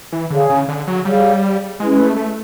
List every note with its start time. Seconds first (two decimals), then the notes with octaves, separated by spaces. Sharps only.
0.12 E3
0.30 D3 G#4 C#5 F5
0.50 C#3
0.68 D3
0.87 F#3
1.05 G3 G#4 C#5 F5
1.80 G#3 C#4 E4 G#4 B4
1.91 G#3
1.99 A3
2.16 A3